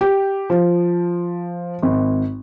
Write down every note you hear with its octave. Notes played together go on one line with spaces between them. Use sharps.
G4
F3
G#1